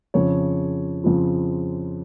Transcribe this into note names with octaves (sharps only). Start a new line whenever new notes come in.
F2 C#3 F3 C#5
F2 C#3 F3